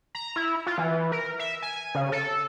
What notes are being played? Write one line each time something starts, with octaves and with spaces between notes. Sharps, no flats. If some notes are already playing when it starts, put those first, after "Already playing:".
A#5
E4
F4
E3
A#4
E5
G#5
C#3
A4